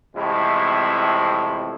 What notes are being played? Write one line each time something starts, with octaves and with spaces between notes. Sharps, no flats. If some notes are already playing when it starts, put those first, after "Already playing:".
A1 F2 C3 G#3 A3 E4